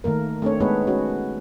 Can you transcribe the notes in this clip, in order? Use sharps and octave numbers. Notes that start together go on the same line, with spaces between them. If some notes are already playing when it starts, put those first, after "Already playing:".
D#3 A3 A#3 A#4
A3 C4 D4 C#5
G#3 B3 D#4 G#4 B4 C#5
C#4 F#4